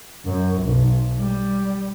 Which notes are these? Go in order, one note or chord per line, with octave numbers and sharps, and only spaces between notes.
F#2
B1
G3